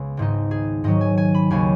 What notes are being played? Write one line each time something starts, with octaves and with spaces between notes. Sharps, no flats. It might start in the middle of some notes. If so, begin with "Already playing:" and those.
Already playing: C#2 C#3 B3 G#4
G#1 G#2 G#3 D#4
G#4
G#2 D#3 F#3 D#5
G#5
G#5
B5
D#2 C#3 F#3 G#5